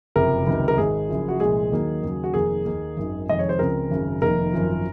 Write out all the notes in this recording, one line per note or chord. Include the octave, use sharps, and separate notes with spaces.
F#1 F2 C3 F3 A#4
C#2 C3 D#3 F#3
A#4
G#1 G#2 D#3 G#4
F#1 F#2 F3
F#4
C2 A#2 F3 G#3 G#4
D#2 D#3 F#3 A#3
D#2 C#3 F#3
F#4
F1 F2 D#3 A#3 G#4
D#2 D#3 A#3
G#1 F#2 D#3
F2 C3 D#3 G#3 D#5
C#5
C5
C#2 C#3 F3 C4 A#4
G#1 F#2 C#3
F1 F2 D#3 A#3 A#4
G#1 F#2 F3